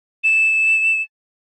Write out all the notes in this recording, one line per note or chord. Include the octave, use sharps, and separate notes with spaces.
E7